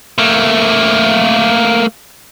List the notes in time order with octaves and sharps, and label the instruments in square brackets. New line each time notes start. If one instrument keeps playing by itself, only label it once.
[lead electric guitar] A3 A#3